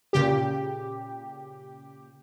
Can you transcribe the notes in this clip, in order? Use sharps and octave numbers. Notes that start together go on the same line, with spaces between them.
A#2 C#3 G4